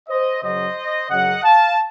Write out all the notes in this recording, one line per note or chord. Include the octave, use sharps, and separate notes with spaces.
C5 D#5
F#2 C#3 F#3 C5 D#5
F#2 C#3 F#3 D#5 F#5
F5 A5